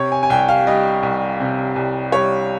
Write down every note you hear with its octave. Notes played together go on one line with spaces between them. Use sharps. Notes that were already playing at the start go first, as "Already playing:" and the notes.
Already playing: C3 C#5
G#5
G#5
C2 G5
F5
G3 D#5
C2
C3
C2
G3 C#5